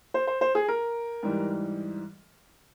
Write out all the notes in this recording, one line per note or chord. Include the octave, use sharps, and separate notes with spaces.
C5
C5
C5
G#4
A#4
G#2 E3 G3